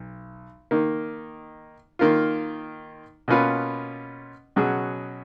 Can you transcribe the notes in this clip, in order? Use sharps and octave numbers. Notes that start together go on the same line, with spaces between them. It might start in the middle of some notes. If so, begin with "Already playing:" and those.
Already playing: B1
D#3 A#3 D#4
D#3 A#3 F4
B2 A#3 C#4 F4 B4
B2 F#3 C#4 G#4